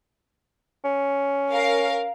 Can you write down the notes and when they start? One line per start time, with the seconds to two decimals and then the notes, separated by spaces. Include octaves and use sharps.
0.84 C#4
1.51 A#4 F5